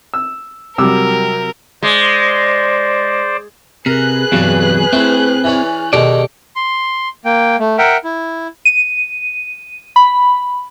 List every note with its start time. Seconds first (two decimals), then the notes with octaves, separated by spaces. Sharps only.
0.14 E6
0.78 C3 F#3 G3 A#4 D6 E6
1.83 G#3 C5 D5
3.86 C3 G#4 A#4 B4 F#6
4.32 E2 G2 C3 F#3 D5
4.93 A3 C4 E4
5.44 E3 C#4 D5
5.93 B2 D#3 G#3 G4 A4 D5
6.56 C6
7.25 A#3 G5
7.59 A3
7.78 A#4 E5 F#5 G5
8.04 E4
8.65 D#7
9.96 B5